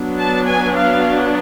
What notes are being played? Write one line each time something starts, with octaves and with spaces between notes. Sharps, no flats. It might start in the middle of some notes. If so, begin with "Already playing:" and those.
Already playing: F#3 B3 D4
A5
G#5
F5